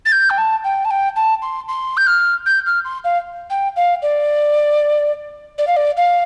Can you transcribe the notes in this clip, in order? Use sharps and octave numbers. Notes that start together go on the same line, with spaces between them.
A6
G6
G5
A5
G5
A5
G5
A5
C6
C6
G6
F6
G6
F6
C6
F5
G5
F5
D5
D5
F5
D5
F5